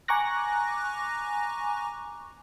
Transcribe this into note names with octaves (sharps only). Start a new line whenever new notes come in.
G#5 A#5 C#6 D6 F#6 A#6